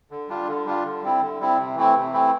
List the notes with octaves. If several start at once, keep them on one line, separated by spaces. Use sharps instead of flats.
D3
G3 D4 F4
D3
G3 D4 F4
D3
G3 C4 E4
D3
G3 C4 E4
C3
E3 A3 C4 E4
C3
E3 A3 C4 E4